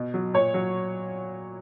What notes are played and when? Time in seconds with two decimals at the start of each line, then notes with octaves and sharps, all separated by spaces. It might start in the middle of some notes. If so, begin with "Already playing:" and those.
Already playing: B2
0.14 F#3
0.34 A#2 C#5
0.54 F#3